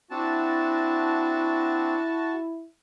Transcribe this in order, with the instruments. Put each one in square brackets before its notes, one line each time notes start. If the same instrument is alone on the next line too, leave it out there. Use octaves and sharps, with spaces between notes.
[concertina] C4 D4 [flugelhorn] E4 [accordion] F#4 A5